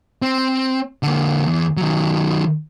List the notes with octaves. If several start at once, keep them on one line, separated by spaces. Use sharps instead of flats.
C4
D3 A#3
E2
D#3 F#3